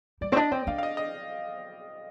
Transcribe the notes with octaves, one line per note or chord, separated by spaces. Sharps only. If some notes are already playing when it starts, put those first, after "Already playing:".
G3 D5
C4 D5
D4 D#5
C4 G5
D4 F5
F5
D#5
D#5